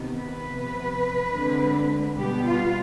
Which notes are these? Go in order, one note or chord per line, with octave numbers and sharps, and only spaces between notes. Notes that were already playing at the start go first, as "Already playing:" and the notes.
Already playing: C3 D#3 B3
B4
C3 F3 B3
D3 G#3 C4
B2 G3 B3 G4
F4